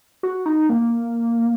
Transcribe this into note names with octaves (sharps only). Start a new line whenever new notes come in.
F#4
D#4
A#3